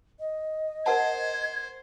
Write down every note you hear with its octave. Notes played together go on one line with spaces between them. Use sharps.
D#5
A#4 C5 F#5 A5 G#6